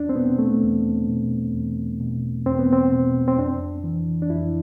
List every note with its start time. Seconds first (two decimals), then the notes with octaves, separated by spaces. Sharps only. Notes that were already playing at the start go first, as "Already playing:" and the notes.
Already playing: E2 D4
0.09 C4
0.16 B2 B3
0.39 A3
0.63 E2
1.08 B2
1.54 E2
2.00 B2
2.46 E2 C4
2.59 B3
2.72 C4
2.92 B2
3.28 C4
3.38 F2 D4
3.84 E3
4.22 D4
4.30 F2 E4